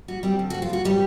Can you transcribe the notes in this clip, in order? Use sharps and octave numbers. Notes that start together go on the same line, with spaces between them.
G3 F#4
G3 C4 G4
D3
F#4
F2
F4
G3 F#4
G3 C4 G4